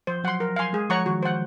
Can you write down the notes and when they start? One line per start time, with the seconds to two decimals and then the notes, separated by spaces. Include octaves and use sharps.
0.07 F3 C5
0.24 F#3 F#5 C6
0.40 A#4
0.56 F5 G#5 C6
0.73 G#3 G#4
0.89 F3 C#5 F#5 A#5 C#6
1.06 D#3 F#4
1.23 C5 F#5